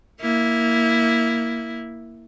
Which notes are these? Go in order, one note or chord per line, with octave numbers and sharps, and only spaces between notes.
A#3 E4